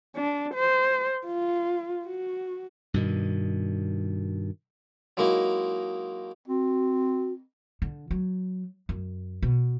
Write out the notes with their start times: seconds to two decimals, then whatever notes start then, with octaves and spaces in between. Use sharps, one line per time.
0.16 D4
0.55 C5
1.27 F4
2.05 F#4
2.94 G2 B2 D#3
5.17 F#3 G#3 A#3 D#4 E4
6.48 C4 F#4
7.82 D3
8.11 F#3
8.89 F#2
9.42 B2